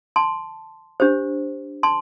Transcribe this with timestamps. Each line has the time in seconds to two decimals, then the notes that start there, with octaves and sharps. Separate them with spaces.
0.16 A5 C6
1.00 D4 G4 C5
1.83 A5 C6